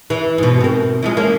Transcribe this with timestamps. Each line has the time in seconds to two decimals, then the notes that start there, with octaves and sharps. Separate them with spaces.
0.10 E3
0.38 G#2 B2
0.61 C4 A#4
1.03 E3 F3 G#3
1.17 A#3 C#4